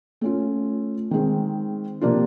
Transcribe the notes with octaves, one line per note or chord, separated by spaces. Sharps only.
A3 C#4 F4
D#3 G#3 C4
C3 F3 A#3 D4 F4